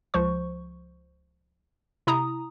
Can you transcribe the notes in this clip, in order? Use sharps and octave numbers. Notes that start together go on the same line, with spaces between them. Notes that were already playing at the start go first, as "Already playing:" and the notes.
C#2 F3 C5 C#6
C3 E4 A#5 D#6